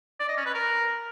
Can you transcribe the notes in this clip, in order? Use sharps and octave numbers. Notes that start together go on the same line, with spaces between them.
D5
D#5
C#4
B4
A#4